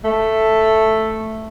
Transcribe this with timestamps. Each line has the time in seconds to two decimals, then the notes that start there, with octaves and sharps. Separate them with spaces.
0.04 A3